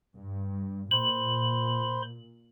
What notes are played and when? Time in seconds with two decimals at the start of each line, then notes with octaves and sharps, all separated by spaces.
0.17 G2
0.91 A#2 C5 B5 C6 F#7